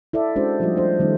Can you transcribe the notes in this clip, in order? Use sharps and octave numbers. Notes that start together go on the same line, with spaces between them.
E4 A4 D5 E5
G#3 C#4 D4 F#4 C5
F3 G3 A3 F4 G4 D#5
A3 D4 C5
D#3 G3 A3 C#4 D#4